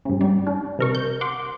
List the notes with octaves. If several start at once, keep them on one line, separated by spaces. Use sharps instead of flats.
G2 C#3
G3
D4
C3 A#4 C#6
G6
F#5 C6 D6